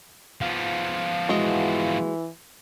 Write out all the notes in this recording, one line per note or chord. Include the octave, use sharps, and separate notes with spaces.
F3 B3 F5
E3 G#3 F#4